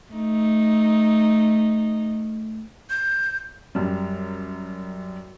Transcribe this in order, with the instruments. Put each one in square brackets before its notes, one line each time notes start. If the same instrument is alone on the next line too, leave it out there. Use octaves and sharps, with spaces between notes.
[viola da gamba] A3 D#4
[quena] G6
[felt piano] F#2 G3